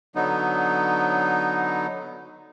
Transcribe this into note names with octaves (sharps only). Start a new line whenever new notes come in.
D3 F#3 B3 D#4